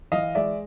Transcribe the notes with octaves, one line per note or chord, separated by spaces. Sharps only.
E3 D#5 F5
G#3 D5 E5